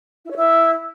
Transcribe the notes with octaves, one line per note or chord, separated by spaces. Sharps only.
E4
C#5
E4